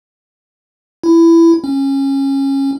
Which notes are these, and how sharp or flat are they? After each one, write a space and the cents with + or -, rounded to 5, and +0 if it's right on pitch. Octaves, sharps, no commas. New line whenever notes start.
E4 +15
C#4 -20